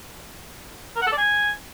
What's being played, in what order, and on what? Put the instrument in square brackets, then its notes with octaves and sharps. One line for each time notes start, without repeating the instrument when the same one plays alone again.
[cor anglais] A#4
F#5
A4
D5
G#5